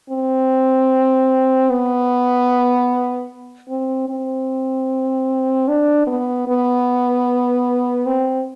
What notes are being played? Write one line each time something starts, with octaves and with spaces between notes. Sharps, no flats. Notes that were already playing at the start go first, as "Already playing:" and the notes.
C4
B3
C4
C4
D4
B3
B3
C4